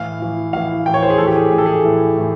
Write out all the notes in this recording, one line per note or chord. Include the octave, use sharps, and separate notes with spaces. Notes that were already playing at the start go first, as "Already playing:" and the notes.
Already playing: A2 E3 F5
A2 E3
A2 E3 F5
A2 E3 G5
C#5
C5
G#4
A2 E3 A4
G4
G#4
A2 E3 G#4 A4
G#4
A2 E3
A2 E3